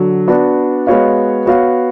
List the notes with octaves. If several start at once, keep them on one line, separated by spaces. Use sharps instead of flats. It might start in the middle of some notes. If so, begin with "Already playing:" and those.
Already playing: D3 F#3
B3 D4 F#4
G#3 B3 F#4 C#5 F5
B3 F#4 C#5 F5